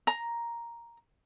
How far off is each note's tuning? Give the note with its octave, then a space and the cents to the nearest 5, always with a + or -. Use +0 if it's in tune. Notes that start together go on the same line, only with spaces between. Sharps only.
A#5 +5